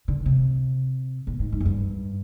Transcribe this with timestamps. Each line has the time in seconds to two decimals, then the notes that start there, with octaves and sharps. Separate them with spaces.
0.08 D3
0.26 C3
1.27 A#2
1.39 G#2
1.52 G#2
1.60 F#2
1.66 G2